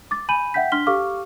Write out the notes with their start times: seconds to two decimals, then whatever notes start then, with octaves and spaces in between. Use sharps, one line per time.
0.11 D6 A6
0.29 G#5 B5 G6 D#7 F#7
0.54 E5 F#5 G5 G6 B6
0.72 D4 C6 F6 B6 G7
0.87 G4 A4 F5 C#6 D6 F6